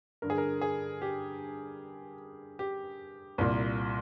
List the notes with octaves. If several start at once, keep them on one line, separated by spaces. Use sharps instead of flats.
G2 D3 A#4
G#4
A#4
G#4
G4
G4
C2 A#2